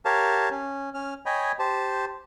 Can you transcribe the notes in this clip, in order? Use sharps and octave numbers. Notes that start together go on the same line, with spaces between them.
G4 A#4 C#5 F5 A5
C#4
C#4 F6
C#5 D#5 G5 G#5 B5
G4 C5 A5